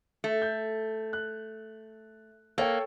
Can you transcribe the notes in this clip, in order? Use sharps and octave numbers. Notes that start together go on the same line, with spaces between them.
A3
G6
F#6
A#3 A4 C#5 G5